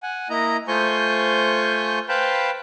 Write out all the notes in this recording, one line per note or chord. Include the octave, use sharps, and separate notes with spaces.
F#5 G#5
A#3 E4 D#5 A#5
A3 F4 C5 G#5 C#6 G6
B4 C5 F5 G5 A5 B5